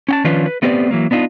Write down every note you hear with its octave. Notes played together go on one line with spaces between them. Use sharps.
C#4 G5 A5
D#3 F3 C#4 D4 F4 B4
B4
A3 B3 C4 G4 B4 D5
E3 F#3 A#3
B3 D4 D#4 F4